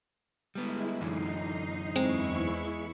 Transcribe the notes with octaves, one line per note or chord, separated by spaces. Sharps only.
G3 G#3 B3 E4
F#2 D3 E3 D#4 C7
E2 G#3 C4 E4 C#6